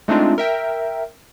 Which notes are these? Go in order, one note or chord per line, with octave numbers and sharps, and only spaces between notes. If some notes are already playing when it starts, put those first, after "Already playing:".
G#3 A3 C4 D4 D#4 F4
A#4 E5 G5